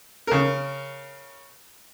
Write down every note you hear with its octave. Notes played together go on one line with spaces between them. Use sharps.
C#3 A#4